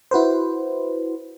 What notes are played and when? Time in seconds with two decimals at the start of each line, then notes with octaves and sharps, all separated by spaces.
0.11 E4 F#4 B4 C5